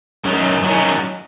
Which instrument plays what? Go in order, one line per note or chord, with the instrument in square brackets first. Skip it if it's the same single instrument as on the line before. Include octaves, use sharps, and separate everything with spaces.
[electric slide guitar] F#2 D#3 F#3 C#4
D#3 F#3 C#4